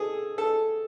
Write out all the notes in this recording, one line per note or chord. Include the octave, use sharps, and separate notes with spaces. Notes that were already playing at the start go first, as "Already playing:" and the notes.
Already playing: G#4 A4
A4